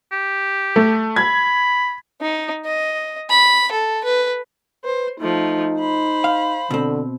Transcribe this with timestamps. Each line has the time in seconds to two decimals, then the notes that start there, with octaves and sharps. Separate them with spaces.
0.12 G4
0.76 A3
1.16 B5 G#6
2.21 D#4
2.65 D#5
3.29 B5
3.71 A4
4.04 B4
4.84 B4 C5
5.20 F3 A3 D#4
5.79 C5 B5
6.24 F5
6.71 B2 D3 C4